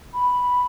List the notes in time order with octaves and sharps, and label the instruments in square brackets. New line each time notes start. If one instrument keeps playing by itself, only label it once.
[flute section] B5